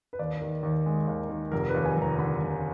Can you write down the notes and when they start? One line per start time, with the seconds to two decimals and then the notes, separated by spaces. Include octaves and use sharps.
0.13 B4
0.19 D#2 D5
0.41 D#3
0.63 D#2
0.86 G#3
1.08 D#2
1.29 D#3
1.52 F1 A#4
1.69 B4
1.74 D#2
1.86 G#5
1.97 F1 A#5
2.18 D3 B5
2.41 F1